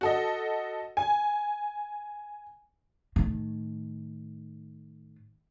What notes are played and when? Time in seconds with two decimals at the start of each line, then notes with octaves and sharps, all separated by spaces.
0.01 F#4 A4 D#5
0.97 G#5
3.16 A2 D#3